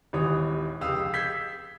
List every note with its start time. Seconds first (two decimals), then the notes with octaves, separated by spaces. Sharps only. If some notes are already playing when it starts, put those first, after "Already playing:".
0.13 D#1 G#1 E3 C#5 D#6
0.81 F1 C#2 G4 F5 D#6 E6
1.14 E6 G6 G#6 B6 C7